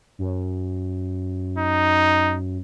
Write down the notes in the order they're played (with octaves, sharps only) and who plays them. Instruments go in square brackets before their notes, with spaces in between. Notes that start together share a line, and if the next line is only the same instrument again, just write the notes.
[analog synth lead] F#2
[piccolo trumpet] D#4